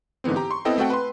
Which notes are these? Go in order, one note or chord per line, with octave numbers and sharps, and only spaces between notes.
G#2 D3 E3 B3 C4
G4 A#5
C6 C#6
B3 C4 E4 A4 D#5 G5
A3 C4 F#4 A4 F#5 G5
B4 C6